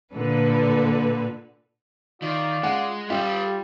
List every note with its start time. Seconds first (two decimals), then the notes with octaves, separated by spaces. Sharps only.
0.14 A#2 D3 B4
2.22 D#3 F4 D5
2.63 G#3 F#5
3.10 G3 F4 G4 A4